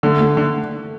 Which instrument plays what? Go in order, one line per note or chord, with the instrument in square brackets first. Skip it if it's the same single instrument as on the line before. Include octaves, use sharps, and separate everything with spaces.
[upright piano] D3 [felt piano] A3
[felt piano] A3
[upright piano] D3